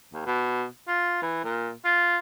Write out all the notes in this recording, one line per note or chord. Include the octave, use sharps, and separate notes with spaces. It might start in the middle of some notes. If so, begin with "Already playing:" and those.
D#2
B2
F4
E3
A#2
F4